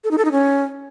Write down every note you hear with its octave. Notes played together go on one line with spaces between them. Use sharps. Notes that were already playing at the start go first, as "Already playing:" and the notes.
A4
D#4
A4
D#4
C#4